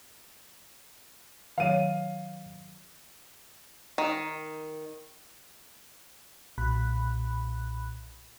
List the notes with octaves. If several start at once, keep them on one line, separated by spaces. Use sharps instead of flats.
D#3 F#3 C#5 F5 D#7
D#3
B1 A#2 B5 F#6